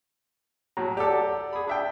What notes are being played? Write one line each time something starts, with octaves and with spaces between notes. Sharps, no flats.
A2 F#3 A#5
G4 A4 D5 F#5
G#4 B5
D4 E5 G5